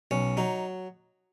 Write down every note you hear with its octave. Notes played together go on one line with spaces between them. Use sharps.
B1 C#4
F#3 D#4